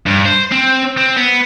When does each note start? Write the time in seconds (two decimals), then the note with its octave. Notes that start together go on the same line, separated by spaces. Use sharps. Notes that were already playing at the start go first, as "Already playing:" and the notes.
0.06 G2
0.25 C5
0.52 C4
0.97 C4
1.17 B3